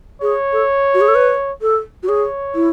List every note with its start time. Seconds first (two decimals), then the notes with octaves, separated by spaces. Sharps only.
0.22 G#4 C#5
0.53 A4
0.94 F#4
1.01 G#4
1.08 A4
1.15 B4
1.62 A4
2.03 F#4
2.09 G#4 C#5
2.55 E4